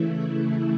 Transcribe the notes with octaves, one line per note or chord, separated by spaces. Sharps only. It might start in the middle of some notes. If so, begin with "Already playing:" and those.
Already playing: C#3 E3 A3 E4